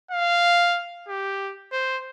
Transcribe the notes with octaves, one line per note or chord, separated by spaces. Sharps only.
F5
G4
C5